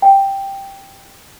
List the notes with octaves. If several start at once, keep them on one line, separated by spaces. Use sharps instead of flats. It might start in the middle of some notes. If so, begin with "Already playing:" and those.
G5